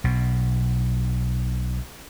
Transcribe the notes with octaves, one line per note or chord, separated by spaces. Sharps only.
B1 B2